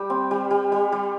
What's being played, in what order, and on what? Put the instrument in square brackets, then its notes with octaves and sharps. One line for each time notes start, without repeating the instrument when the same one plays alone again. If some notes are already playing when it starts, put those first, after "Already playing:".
Already playing: [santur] G3 G5
C4
G3
G3
G3
G3